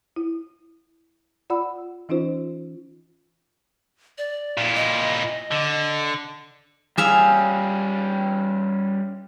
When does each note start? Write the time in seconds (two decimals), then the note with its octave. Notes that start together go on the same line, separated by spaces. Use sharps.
0.16 E4
1.50 F4 D5 F#5 B5 E6
2.09 E3 C#4 D#4 F4 C5
4.18 D5
4.57 A#2 E4
4.75 D#5
5.51 D3
6.97 G3 C#4 G#4 E5 F5